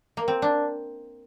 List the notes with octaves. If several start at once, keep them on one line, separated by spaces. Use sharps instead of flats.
A#3
C4
D4